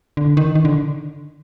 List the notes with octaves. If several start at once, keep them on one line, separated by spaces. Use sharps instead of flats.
D3
D#3
D#3
D3